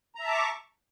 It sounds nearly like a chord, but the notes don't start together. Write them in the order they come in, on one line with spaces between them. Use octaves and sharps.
A#5 E5 A5 D6 C#6